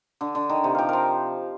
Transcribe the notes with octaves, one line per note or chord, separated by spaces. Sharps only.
D3
D3
D#3
C3
F3 F5 G5
F3 A#4